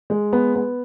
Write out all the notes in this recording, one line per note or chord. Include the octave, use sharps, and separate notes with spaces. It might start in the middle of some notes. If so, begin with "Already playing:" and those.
G#3
B3
B3